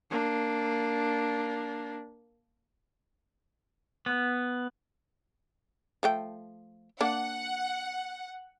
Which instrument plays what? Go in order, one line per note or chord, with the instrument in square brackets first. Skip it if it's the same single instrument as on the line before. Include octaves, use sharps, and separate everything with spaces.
[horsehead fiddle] A#3 D4
[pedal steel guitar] B3
[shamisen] F3 A3 G5
[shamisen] A#3 D4 [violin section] F#5